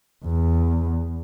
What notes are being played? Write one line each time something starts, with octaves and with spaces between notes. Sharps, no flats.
E2